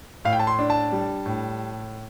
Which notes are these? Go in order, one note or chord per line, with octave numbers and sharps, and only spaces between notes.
A2 F5
G5
A5
C6
D4
A5
G3
A2